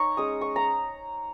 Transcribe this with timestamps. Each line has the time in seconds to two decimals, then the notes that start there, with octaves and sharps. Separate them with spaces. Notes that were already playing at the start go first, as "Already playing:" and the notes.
Already playing: D#4 C#5 A#5 C#6
0.17 G#3 C#4 D#6
0.41 C#6
0.56 A#5